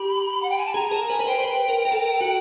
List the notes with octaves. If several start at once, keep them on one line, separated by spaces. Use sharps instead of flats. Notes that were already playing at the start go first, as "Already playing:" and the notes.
Already playing: G4 B5
F#5
G5
G#5
A5
G#4 A#5
A#4 A5
B4 G#5
B4
C5 G5
C5
B4
A#4
A#4
A4
F#4